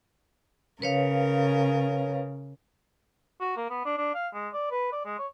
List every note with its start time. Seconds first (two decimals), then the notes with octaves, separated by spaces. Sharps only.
0.82 C#3 A#4 B4 C#5 F5
3.40 F#4
3.56 A#3
3.70 B3
3.85 D4
3.97 D4
4.15 F5
4.33 G#3
4.53 D5
4.71 B4
4.92 D5
5.05 G#3
5.19 C#5